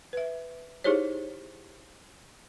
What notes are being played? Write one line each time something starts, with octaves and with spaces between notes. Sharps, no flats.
B4 E5
D#4 E4 G4 G#4 C5 C#5